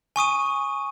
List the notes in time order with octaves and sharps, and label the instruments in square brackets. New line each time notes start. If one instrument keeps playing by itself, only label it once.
[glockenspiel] G#5 C#6 D#6 D#7